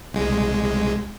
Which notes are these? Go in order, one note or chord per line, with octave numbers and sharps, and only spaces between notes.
C2 G#3